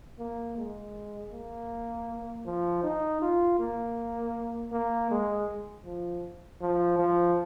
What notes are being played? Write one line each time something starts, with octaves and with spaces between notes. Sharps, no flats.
A#3
G#3
A#3
F3
D#4
F4
A#3
A#3
G#3
F3
F3
F3